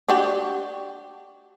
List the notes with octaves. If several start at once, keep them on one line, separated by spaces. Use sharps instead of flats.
D4 F#4 G4